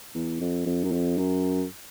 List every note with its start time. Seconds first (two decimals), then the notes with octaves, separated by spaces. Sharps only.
0.15 E2
0.40 F2
0.66 F2
0.84 F#2
0.91 F2
1.18 F#2